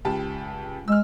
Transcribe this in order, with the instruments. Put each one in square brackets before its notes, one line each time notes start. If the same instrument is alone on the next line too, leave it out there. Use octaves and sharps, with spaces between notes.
[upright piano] C#2 G4 A5
[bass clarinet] G#3 [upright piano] E6 F6